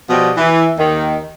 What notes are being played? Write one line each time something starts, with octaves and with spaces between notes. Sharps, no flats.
B2 F3 G3 D#5
E3
D#2 D#3